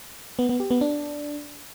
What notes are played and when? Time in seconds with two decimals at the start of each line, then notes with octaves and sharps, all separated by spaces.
0.39 B3
0.49 B3
0.60 G4
0.71 B3
0.81 D4